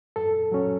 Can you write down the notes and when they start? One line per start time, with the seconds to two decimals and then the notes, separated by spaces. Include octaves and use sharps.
0.16 F#2 A4
0.52 F#3 C#4